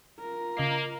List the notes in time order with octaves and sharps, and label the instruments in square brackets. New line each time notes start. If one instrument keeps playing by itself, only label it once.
[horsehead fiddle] F4 A#4
[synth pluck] C#3 D#5 C7 [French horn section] A#3